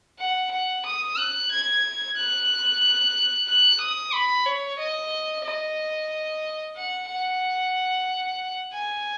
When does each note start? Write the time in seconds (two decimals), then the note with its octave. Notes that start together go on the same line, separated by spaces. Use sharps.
0.19 F#5
0.51 F#5
0.85 D#6
1.18 F#6
1.51 G#6
2.17 F#6
3.47 F#6
3.80 D#6
4.13 B5
4.46 C#5
4.79 D#5
5.45 D#5
6.76 F#5
7.09 F#5
8.73 G#5